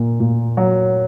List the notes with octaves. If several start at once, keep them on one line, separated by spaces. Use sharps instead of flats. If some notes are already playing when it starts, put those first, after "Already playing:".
Already playing: A#2 A#3
A#2
F#3